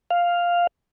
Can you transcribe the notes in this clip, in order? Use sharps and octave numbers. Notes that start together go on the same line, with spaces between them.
F5